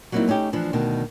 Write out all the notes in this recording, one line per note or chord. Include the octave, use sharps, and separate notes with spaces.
F#3 G3 A#3 C4 D#4 E4
A3 C#4 D#4 G4
E3 F3 D4
D2 B2 D#3